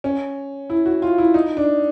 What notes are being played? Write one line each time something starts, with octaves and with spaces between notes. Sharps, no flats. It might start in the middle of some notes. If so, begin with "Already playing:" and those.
C#4
E4
F#4
F4
E4
D#4
D4